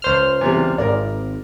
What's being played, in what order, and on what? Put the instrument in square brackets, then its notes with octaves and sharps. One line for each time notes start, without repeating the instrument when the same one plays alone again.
[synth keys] C#2 C5 F6
[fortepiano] E2 C3 G3
[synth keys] G#1 [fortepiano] A#4 D5